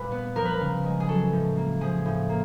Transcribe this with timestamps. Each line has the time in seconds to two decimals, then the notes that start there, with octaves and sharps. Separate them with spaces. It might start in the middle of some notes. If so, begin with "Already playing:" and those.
Already playing: A#2 G3 B4
0.12 B3
0.36 F3 A#4
0.45 B4
0.54 A#4
0.61 C#3
0.84 G#3
1.00 G#4
1.09 F#3 A4
1.33 A2
1.57 A#3
1.81 F3 G#4
2.06 A2
2.29 A#3